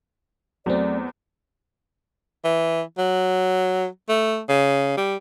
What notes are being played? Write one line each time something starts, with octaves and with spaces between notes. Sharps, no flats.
E2 F#3 A3 C4 D5
E3
F#3
A3
C#3
G3